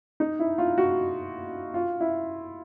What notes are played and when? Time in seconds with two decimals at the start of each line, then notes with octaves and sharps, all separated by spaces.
0.20 D#4
0.40 E4
0.58 F4
0.78 F#4
1.74 F4
2.00 E4